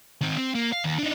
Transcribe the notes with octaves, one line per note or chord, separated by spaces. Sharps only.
D#3 C4
C4
A#3
F5
D#2
D4 D#4